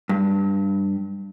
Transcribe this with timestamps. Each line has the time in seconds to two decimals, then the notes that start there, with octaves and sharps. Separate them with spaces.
0.09 G2